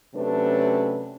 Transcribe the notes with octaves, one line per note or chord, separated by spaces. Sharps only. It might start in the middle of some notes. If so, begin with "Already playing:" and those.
C3 F#3 A3 C#4 D4 B4